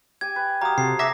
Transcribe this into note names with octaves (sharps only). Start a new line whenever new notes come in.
G4 G#5 G#6
B4
F#3 G4 F5 A#5 D#6
C3 F#4 A4 C5 C7
F#4 G#4 E5 A#5 D6 A#6